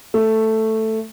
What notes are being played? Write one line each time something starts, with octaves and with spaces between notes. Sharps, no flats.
A3